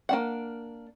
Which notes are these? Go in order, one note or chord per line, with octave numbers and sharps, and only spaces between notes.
A#3 D4 F#5